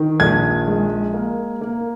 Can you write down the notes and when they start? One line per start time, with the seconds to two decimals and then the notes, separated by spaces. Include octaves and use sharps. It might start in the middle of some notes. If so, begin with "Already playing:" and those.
Already playing: D#3
0.20 A#1 G#6
0.67 G#3
1.14 A#3
1.61 A#3